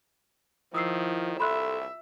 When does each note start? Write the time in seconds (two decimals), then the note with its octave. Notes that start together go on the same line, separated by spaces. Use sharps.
0.75 D#3 F3 E4 D#6 E6 C7
1.40 C2 A4 E5 B5 C6 F#6